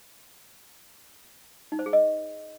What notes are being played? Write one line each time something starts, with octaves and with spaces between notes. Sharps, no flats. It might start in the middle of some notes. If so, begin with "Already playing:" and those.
D#4
C5
G#4
D#5